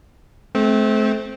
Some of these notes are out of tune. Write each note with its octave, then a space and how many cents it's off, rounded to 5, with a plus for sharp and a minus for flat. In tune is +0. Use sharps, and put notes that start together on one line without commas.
A3 -35 C4 -5